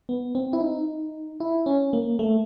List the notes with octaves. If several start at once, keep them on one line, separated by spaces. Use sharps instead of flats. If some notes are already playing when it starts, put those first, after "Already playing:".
B3
C4
E4
D#4
E4
C#4
A#3
A3